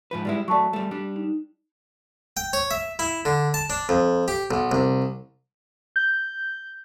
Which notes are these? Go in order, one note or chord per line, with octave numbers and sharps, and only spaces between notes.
G#2 F3 B4
G3 G#3 E4
F#3 A3 D5 A5 C#6
G3 A3
G3 D4
D#4
G5
C#5
E5
E4
D3
A5
D4
F2
G4
B1
C2
G6